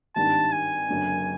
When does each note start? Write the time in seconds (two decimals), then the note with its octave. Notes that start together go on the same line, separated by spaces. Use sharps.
0.16 G#1 G2 D#3 A5
0.52 G#5
0.89 F#1 F#2 D3